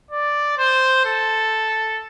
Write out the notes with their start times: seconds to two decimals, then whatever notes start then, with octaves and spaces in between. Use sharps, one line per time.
0.11 D5
0.58 C5
1.05 A4